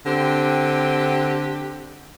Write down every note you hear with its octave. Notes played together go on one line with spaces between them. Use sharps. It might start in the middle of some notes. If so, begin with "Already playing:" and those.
D3 C4 G4